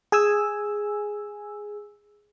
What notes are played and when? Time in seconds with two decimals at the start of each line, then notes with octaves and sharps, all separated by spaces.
0.12 G#4 G#5 E6